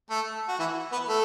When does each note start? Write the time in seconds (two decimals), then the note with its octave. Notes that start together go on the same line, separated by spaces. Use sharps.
0.10 A3 A4
0.48 F#4
0.59 E3 E4
0.92 B3 B4
1.09 A3 A4